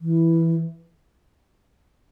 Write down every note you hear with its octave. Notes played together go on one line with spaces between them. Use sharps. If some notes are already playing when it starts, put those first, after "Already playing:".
E3